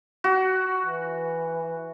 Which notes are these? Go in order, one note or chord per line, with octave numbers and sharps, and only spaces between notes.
F#4
E3